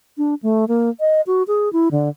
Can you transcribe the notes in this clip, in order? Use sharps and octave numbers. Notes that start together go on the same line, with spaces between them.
D4
A3
A#3
D#5
F#4
G#4
E4
D3